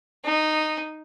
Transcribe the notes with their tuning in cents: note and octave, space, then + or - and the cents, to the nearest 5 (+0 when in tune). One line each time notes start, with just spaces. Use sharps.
D#4 -10